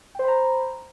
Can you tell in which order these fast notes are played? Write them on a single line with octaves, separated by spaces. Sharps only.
G5 C5 B5 A#5